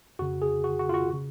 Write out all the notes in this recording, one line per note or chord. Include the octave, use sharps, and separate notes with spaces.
F2 C#3 F#4
G#4
F#4
F#4
F4
F#4
C#3